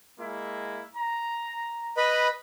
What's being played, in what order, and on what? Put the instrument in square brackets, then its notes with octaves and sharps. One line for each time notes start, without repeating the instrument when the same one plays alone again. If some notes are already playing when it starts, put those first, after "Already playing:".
[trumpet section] G#3 A#3 E4
A#5
[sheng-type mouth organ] B4 D#5 B5